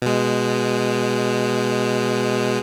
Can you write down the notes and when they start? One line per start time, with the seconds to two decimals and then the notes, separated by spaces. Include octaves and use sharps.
0.02 B2 G#3